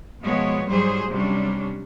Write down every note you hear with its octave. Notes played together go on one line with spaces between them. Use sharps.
B2 F3 G#3 B3 C#5
G#2 F#3 G3 G#4 C5
C3 F#3 G3 C#4 D4